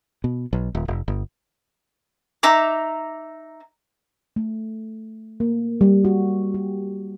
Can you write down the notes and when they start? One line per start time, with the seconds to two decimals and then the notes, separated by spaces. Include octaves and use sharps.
0.24 B2
0.53 B1
0.75 D#1
0.88 F1
1.08 G1
2.43 D#4 E5 A#5 D6
4.36 A3
5.40 A#3
5.81 G3
6.05 F#4
6.54 G4